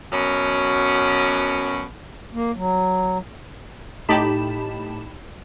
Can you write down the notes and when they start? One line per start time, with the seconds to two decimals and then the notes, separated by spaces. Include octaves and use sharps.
0.12 F#2 B2 C#4
2.33 A#3
2.55 F#3
4.09 A2 D#4 G4 A5 B5 E7